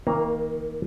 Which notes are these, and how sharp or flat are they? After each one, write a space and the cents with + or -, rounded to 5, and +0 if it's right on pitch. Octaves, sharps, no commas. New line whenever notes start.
D#3 +30 A#3 +0 A#5 +5